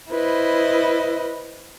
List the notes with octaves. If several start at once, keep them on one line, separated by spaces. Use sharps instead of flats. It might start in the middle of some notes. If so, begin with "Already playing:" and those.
E4 B4 C5 D#5